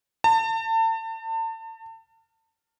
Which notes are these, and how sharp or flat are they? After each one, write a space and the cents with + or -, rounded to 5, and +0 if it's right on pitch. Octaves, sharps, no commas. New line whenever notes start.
A5 +35